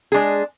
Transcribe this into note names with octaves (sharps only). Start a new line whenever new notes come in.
G#3 D4 G#4